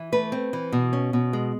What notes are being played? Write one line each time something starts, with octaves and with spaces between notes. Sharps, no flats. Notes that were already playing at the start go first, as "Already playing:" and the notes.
Already playing: E3
A3 B4
C4
E3
B2
C#4
B2
G#3